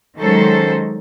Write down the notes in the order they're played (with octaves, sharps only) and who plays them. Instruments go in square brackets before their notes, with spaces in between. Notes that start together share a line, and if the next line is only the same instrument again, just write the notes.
[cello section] D#3 F#3 G#3 C#4 A4 C5